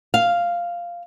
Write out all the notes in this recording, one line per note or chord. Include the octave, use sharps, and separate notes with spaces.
F5